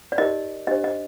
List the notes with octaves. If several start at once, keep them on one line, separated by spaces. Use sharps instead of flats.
D5
D#4 G4 A#4 D#5
D4 G4 C5 D#5
D#5